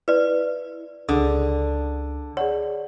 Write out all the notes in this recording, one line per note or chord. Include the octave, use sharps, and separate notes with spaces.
E4 B4 D5
C#2 D3 D4 G#4 D#6
G#4 C#5 D5 F#5